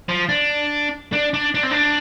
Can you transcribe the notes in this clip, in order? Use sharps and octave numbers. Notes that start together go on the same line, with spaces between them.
F3
D4
D4
D4
D4
C4
D4